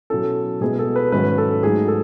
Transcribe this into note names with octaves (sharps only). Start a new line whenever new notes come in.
B2 F#3 C#4 E4 A4
B2 G#3 B3 E4 G#4
A4
B4
G#2 D#3 F#3 C#4 E4 B4
A4
G#2 F#3 A3 D#4 G#4
A4